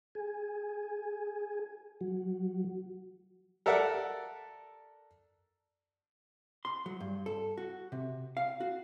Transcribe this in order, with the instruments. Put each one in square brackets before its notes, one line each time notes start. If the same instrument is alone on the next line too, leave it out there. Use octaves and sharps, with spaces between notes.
[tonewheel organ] G#4
F#3
[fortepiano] A4 A#4 D5 E5 F#5
[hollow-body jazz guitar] C6
F#3
G2
A4
F#4
C3
F5
F#4